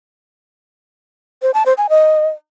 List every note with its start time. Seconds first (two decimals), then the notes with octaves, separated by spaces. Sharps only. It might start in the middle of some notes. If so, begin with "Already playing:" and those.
1.42 C5
1.54 A5
1.66 C5
1.78 G#5
1.89 D#5